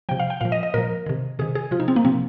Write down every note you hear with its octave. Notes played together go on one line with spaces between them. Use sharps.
C3 F3 G5
F5
G5
A#2 F3 F5
D#5
D#5
A#2 F3 A#4
C3 D#3
C3 D#3 G#4
G#4
C3 F3 F4
D#4
C4
A#3
C3 F3 C4